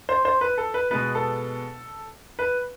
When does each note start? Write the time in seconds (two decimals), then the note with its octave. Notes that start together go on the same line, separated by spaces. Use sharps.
0.09 C5
0.25 C5
0.41 B4
0.58 A4
0.74 B4
0.91 B2 G#3 B3 B4
1.15 A4
2.39 B4